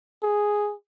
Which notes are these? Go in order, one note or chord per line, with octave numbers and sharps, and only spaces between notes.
G#4